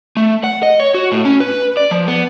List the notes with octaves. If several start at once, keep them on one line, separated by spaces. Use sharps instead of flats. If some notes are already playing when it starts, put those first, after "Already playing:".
A3
F#5
D#5
C#5
F#4
A2
C#4
B4
D5
F3
B3